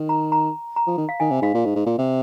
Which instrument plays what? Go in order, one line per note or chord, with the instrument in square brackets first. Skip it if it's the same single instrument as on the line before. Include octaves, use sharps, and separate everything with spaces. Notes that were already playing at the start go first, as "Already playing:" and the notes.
Already playing: [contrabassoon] D#3
[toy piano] A#5
A#5
A#5
[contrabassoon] F3
D#3
[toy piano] F5
[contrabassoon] D#3 [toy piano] G#5
[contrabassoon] C3
[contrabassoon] G#2 [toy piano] F5
[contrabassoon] A#2
G#2
G#2
A#2
C3